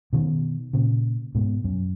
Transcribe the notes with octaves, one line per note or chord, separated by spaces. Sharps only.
B2 D#3
A#2 C#3
G#2 B2
F#2